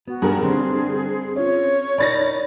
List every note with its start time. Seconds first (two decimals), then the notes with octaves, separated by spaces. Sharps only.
0.08 B3 F#4
0.22 G2 G#4 A#4
0.43 G2 D3 C4 G#4
1.36 C#4 F4 C#5
1.98 D#4 A#4 D5 B5 A6 A#6